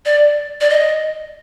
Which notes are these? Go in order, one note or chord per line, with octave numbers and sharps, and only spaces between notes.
D5
D5
D#5